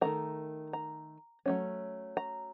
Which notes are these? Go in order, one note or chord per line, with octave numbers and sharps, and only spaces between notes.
D#3 F#3 A3 A#5
A#5
F#3 A3 C#4
A#5